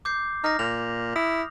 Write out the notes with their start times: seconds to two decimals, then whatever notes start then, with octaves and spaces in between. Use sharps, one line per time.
0.05 D6 G6 C7
0.44 D#4 F6 A#6
0.59 A#2 F7
1.16 E4 D#6